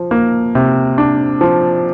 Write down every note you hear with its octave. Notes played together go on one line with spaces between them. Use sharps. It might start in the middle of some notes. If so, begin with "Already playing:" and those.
Already playing: F3
A#3
C3
D4
F3